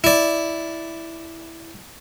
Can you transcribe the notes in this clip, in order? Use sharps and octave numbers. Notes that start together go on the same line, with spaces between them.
E4 D5